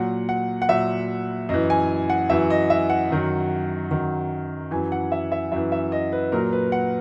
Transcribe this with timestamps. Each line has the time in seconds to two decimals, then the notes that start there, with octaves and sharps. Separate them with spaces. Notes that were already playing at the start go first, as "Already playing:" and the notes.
Already playing: A#2 F#3 F#5
0.29 F#5
0.62 F#5
0.69 A#2 F#3 E5
1.49 F#2 E3 D#5
1.70 G#5
2.10 F#5
2.30 F#2 E3 E5
2.50 D#5
2.70 E5
2.90 F#5
3.10 F#2 D#3 F#3
3.91 F#2 D#3 F#3
4.71 F#2 E3 G#5
4.92 F#5
5.12 E5
5.32 E5
5.52 F#2 E3 E5
5.72 E5
5.92 D#5
6.12 B4
6.32 A#2 F#3 A#4
6.53 B4
6.72 F#5